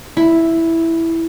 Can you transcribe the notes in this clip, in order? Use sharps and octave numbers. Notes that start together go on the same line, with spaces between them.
E4